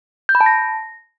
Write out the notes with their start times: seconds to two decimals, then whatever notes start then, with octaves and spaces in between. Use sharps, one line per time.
0.29 G6
0.35 B5
0.41 A5
0.46 A#6